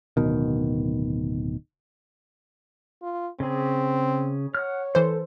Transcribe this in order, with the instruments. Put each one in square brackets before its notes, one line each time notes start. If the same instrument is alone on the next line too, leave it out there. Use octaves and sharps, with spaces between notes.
[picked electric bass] D1 B2 D#3
[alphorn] F4
[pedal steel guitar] C#3 G#4 [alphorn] C4
[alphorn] C#5 [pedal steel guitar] F#5 F6
[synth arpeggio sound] E3 C5 [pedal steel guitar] A4